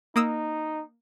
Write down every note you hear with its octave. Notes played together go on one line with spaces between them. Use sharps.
A#3 D#4 D#6 E6